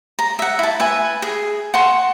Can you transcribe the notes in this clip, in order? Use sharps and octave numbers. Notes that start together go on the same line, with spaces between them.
A#5
E5 F#5
E4 A5
B4 E5 G#5
G#4
F#5 A5 C6 C#6